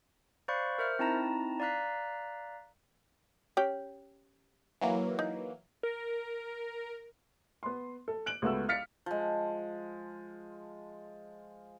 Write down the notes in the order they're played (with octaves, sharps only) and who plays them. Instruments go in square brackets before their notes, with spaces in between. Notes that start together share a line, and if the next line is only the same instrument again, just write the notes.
[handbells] C5 D5 F5 B5 C#6 F#6
A#4 C5 E5 F6
C4 D#4 E4 A5 A#5 A#6
D5 F5 A#5 F#6 B6
[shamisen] C#4 G4 G5
[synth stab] E3 F#3 A#3
[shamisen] D#4
[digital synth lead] A#4
[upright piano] B3 C6
A4
F#6 D7 F#7
C#2 A3 B3 F#4 E6
F5 F6 A6 B6 C#7
[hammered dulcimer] F3 G#3